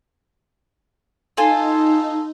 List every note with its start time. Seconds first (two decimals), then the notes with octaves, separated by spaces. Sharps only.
1.37 D#4 F4 A4 G#5